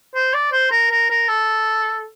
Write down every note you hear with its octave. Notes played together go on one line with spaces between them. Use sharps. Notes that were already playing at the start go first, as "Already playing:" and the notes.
C5
D5
C5
A#4
A#4
A#4
A4